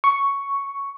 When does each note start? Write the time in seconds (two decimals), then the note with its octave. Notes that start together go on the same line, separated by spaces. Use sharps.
0.04 C#6